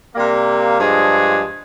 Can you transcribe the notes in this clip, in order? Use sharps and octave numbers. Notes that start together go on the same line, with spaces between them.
C3 G3 A#3
G2 F3 G#3 D4 G#4